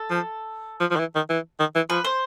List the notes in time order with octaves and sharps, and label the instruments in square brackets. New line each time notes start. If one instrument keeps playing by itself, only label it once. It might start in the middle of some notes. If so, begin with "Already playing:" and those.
Already playing: [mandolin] A4
[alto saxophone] F3
F3
F3
D#3
E3
D#3
E3
D#3
E3
[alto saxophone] F3 [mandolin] B4
[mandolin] C5